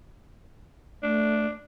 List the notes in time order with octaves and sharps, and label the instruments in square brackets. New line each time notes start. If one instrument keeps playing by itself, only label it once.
[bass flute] A3 [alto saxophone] D4